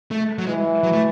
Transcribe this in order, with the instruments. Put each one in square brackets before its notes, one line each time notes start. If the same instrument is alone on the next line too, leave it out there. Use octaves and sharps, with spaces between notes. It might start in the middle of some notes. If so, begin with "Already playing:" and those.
[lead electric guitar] A3
F#3
[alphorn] E3 [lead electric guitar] G#3
[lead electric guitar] F#3
A3